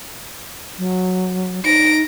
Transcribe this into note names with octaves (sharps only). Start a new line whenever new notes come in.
F#3
D#4 A#6 D7